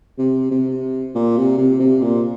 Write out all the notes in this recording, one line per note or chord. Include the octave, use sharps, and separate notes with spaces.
C3
C3
A#2
C3
C3
C3
A#2